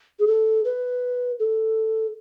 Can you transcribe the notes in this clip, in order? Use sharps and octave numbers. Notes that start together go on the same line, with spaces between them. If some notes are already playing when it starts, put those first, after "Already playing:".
G#4
A4
B4
A4